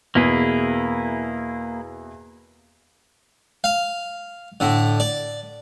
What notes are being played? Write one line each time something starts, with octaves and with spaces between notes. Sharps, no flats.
E2 B2 A#3 E4 G#4
F5
A2 D3
D5